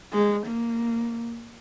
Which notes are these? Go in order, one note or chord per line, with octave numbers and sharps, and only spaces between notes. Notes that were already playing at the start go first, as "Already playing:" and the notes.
G#3
A#3